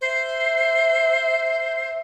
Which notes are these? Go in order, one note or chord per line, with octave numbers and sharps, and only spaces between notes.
C5 E5